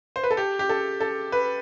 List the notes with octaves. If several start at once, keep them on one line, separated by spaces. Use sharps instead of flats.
C5
B4
A4
G4
G4
A4
A4
B4